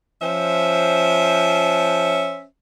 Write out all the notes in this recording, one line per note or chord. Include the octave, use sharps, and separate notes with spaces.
F3 C#4 C5 E5